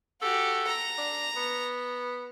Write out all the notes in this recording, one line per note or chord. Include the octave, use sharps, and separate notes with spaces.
F#4 G4 A4
A#5
D4
B3